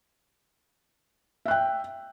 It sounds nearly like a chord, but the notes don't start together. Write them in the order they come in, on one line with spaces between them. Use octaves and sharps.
E5 F#6 G5